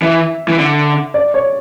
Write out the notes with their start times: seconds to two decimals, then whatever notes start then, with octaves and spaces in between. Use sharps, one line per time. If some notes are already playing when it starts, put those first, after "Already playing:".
0.02 E3 E5
0.48 E3
0.59 D3
1.14 D5
1.34 C#5